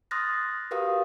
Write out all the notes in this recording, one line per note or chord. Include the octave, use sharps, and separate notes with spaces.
C6 D#6 F6 F#6 A6 A#6
F#4 G4 A#4 B4 F5 D#6